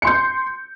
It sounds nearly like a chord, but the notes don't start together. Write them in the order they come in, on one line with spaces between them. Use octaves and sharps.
C#7 C6 G6